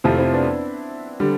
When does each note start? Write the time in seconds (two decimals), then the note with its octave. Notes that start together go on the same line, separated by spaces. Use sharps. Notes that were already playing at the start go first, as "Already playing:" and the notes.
0.04 F2 C3 F3 A3 C4 E4
0.18 C4 E4
0.33 B3 D4
1.20 D3 G3